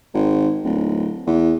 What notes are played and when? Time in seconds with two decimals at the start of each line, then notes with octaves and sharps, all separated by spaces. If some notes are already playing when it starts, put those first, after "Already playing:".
0.14 G#1
0.64 D1
1.27 E2